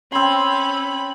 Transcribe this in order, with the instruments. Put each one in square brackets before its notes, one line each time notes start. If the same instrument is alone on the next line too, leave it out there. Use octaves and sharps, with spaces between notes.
[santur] C4 C6 [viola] C#4 B5